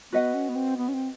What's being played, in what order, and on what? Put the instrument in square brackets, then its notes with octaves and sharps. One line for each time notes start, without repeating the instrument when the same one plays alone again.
[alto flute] B3 [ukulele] F#4 B4 D#5 F#5
[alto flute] C#4
B3
C4
B3
C#4
C4